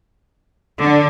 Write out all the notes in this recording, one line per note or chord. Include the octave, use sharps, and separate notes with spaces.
D3